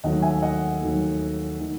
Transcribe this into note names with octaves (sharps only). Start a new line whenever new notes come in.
D#2 D#3 F#3 A3 D#5 F#5
E5 G#5
D#5 F#5
D#2 D#3 F#3 A3
D#3 A3